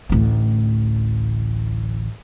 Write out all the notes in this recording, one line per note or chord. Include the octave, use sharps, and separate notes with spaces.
A1 D2